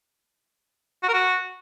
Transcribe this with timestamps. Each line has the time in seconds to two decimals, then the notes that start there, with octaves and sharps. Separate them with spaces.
1.03 F#4
1.08 A#4
1.14 F#4